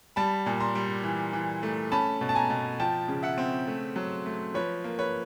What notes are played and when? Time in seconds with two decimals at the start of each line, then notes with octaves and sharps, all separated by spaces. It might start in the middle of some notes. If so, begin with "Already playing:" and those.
0.16 G3 A5 B5
0.46 A#2
0.60 A#5 C6
0.75 G3
1.04 E3
1.33 E3
1.63 A3
1.92 C#4 A5 B5
2.21 B2
2.29 A5
2.35 G#5 A#5
2.50 B2
2.79 F3 G5 A5
3.08 C#3
3.23 E5 F#5
3.38 C4
3.68 A3
3.96 F#3
4.26 A3
4.54 F3 B4 C#5
4.84 A#3
4.99 B4 C#5